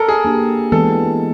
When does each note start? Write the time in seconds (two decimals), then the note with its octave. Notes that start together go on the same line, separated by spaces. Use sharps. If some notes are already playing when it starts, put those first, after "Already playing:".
Already playing: A4 A#4
0.08 G#4
0.25 A#3 D4 G4
0.72 E3 G#3 B3 A4